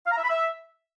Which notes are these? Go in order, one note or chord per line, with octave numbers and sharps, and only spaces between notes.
F5
A#5
E5
B5
E5